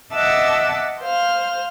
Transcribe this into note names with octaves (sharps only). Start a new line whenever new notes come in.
D#5 E5 F#5 A5 D6 E6
C5 F5 F6